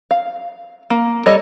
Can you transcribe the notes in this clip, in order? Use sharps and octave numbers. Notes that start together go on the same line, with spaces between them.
F5
A#3
G3 A4 C#5 D#5